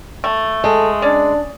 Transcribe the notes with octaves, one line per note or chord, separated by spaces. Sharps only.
A3
G#3 A4
C#4 D4 D5